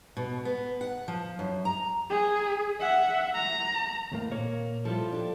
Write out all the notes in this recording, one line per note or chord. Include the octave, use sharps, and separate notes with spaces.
B2
B3
F#5
F3
F#2
A#5
G#4
E5 F#5
A#5
D#2 A2 A#3
A#2 A#3 C#5
F3 G3 E4 F4 A4
D4 G4